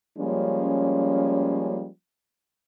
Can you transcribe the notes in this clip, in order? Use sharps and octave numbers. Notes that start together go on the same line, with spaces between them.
F3 G3 G#3 A#3 C#4